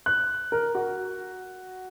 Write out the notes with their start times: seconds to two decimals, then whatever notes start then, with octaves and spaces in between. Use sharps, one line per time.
0.06 F#6
0.52 A#4
0.75 F#4